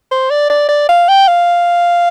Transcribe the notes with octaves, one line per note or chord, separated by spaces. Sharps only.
C5
D5
D5
D5
F5
G5
F5